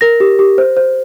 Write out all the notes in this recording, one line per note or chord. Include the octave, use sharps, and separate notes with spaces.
A#4 A#6
G4
G4
C5
C5